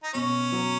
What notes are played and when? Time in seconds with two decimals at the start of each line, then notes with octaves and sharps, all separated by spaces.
0.03 D#4
0.14 B2 C#4
0.52 F#3